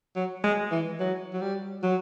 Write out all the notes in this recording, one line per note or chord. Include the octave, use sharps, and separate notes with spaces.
F#3
G#3
E3
F#3
F#3
G3
F#3